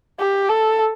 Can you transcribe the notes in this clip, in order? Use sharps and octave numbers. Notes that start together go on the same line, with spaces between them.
G4
A4